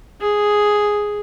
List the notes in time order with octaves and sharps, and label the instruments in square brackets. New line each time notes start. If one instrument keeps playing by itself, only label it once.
[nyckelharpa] G#4